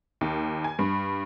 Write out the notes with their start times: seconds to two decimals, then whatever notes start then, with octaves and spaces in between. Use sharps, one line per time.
0.21 D#2
0.64 G#5
0.79 G2